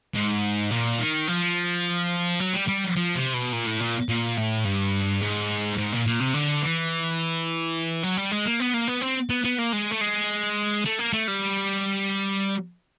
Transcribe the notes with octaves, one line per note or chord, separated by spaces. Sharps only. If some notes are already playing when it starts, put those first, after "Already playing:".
G#2
A#2
D#3
F3
F#3
G3
G3
F3
C3
B2
A#2
A2
A#2
A#2
A2
G2
G#2
G#2
A#2
A#2
C3
D3
E3
F#3
G3
G#3
A#3
B3
A#3
B3
C4
B3
B3
A#3
G#3
A3
G#3
A3
A#3
A3
G3